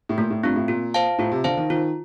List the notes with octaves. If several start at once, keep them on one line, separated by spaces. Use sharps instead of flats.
A2
A#2 A3
A2
G2 C4 F4
A2
A#2 F4
C5 F5 A5
A2 F4
C3
D3 C5 F5 A5
D#3
D#3 F4